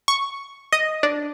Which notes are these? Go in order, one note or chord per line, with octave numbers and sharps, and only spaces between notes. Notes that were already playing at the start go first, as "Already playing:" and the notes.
C#6
D#5
D4